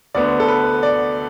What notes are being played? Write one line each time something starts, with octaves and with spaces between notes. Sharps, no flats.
D2 D3 B3 D5
A4
B4
D5